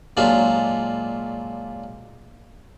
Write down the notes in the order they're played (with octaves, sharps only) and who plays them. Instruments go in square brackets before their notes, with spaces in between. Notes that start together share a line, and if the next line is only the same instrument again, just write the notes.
[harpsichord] A#2 F#3 G#3 D4 F4